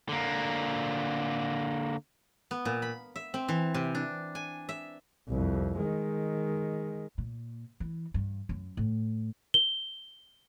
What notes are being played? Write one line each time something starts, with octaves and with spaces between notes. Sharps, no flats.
D3 A#3
B3
A#2
B5
E5
C4
E3
C3
D4
G#5
E5
C2 F2
D#3 G#3
A#2
E3
G2
F#2
A2
G7